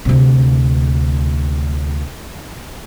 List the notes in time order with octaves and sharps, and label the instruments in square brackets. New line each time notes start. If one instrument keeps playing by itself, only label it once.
[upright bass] D2 C3